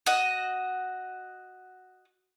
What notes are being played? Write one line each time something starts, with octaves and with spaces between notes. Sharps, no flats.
F#4 D#5